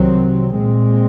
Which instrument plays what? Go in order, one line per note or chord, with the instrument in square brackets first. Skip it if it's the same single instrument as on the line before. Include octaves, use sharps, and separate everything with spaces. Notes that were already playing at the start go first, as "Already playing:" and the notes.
Already playing: [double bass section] C2 C3 D#3 F#3 C4
A#2 G#3 C4